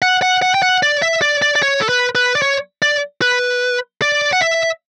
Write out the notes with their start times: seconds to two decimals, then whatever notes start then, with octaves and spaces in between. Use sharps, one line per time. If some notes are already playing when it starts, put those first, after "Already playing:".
0.02 F#5
0.22 F#5
0.42 F#5
0.54 G5
0.62 F#5
0.83 D5
1.02 E5
1.22 D5
1.42 D5
1.56 D5
1.63 C#5
1.81 A4
1.89 B4
2.15 B4
2.35 D5
2.42 C#5
2.82 D5
3.22 B4
4.02 D5
4.33 F#5
4.41 E5